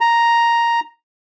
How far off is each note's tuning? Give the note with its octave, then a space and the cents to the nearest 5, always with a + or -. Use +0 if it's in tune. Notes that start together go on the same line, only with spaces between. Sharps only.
A#5 +0